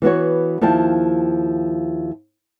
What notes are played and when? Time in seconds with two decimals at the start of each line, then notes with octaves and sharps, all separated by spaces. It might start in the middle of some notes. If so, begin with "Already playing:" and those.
0.02 E3 B3 F#4 C#5
0.61 D#2 F3 E4 G5 A5